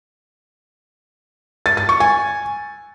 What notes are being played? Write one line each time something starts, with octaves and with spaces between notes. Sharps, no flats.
A6
A6
C#6
G#5